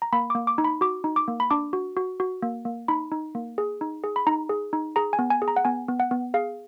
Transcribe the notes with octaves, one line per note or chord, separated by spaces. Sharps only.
A#5
A#3 B5
A#3 D6
D6
D#4
B5
F#4 D6
D#4
D6
A#3
B5
D4 D6
F#4
F#4
F#4
A#3
A#3
D#4 B5
D#4
A#3
G#4
D#4
G#4
B5
D#4 A#5
G#4
D#4
G#4 A#5
G#5
B3
G#5
G#4
A#5
F#5
B3 G#5
B3
F#5
B3
G#4 F5